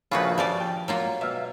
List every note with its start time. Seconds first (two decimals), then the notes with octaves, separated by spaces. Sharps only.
0.11 A#1 C#3 F4 F#4 B4
0.38 F3 G3 D5
0.60 G5
0.88 F#3 A#3 F4
1.21 B2 E5 F5